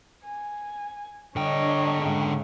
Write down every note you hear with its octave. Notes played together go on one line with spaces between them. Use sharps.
G#5
D3 D4 C#5 D#5 G5
G#2 C#3